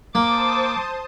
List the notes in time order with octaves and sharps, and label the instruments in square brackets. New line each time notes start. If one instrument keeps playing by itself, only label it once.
[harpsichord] A#3 [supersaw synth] C5 A5 D#6 [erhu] D6